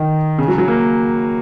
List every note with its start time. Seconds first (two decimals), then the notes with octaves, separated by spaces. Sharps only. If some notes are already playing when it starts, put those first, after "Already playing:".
Already playing: D#3
0.38 C#3
0.48 F#3
0.58 F#3
0.68 A#3